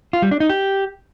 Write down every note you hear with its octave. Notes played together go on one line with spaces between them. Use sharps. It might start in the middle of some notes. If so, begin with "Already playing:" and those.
F4
G3
D4
D#4
G4